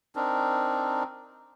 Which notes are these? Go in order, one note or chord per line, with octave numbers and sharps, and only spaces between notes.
C4 D4 D#4 A#4